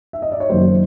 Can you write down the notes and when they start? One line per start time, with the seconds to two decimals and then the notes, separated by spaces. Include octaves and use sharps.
0.13 E5
0.22 D#5
0.31 D5
0.40 C#5
0.50 F#1 F#2 D#3 F#3 A#3 C5